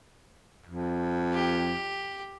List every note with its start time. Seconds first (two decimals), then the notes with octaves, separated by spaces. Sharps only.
0.66 F2
1.33 G4